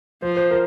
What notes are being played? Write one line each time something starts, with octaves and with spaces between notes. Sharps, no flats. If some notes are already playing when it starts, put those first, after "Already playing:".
F3 C5
C5
A#4